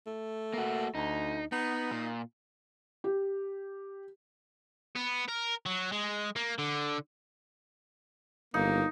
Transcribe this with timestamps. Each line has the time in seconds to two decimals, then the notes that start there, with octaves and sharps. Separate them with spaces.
0.06 A3
0.54 A#3 F#4
0.95 D2 D#4
1.52 B3 D#4
1.91 A#2
3.04 G4
4.96 B3
5.29 A#4
5.66 F#3
5.92 G#3
6.36 A#3
6.59 D3
8.54 G1 A#3 D#4